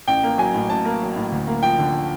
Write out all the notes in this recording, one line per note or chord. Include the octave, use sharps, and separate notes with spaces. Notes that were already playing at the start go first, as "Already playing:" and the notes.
A1 G5
A#3
F#3 G#5
A2
A1 A5
A#3
F#3
A2
D2
A#3
F3 G5
D3